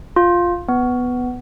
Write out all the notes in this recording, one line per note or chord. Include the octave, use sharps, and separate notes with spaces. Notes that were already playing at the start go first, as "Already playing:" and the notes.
F4
B3